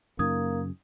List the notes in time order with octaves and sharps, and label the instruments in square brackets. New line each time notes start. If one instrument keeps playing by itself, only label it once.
[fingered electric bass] F#2 C#3 [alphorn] A#3 [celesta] D#4 D#6 G#6